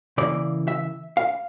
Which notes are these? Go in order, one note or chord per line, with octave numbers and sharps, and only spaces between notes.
C#3 E3 A#3 D5
E5
F5